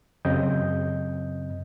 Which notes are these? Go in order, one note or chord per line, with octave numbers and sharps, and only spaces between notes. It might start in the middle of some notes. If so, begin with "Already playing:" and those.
F#2 C#3 C4 D#5 G6